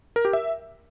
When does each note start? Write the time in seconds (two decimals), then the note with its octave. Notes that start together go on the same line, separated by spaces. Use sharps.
0.16 A#4
0.25 G4
0.33 E5